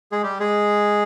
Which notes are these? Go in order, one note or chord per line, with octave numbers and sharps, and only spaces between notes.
G#3 G#4
G3 G4
G#3 G#4